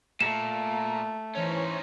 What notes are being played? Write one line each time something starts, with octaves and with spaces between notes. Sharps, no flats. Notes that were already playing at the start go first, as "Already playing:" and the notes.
A#2 A3 E7
E3 C#4 D#4 C5 C#5